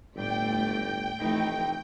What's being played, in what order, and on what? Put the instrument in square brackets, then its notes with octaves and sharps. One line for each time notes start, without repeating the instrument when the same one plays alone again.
[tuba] G1 [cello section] A2 D5 [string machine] G5
[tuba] F1 [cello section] E3 A3 D#4